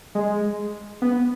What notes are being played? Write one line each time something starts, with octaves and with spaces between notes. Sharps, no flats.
G#3
B3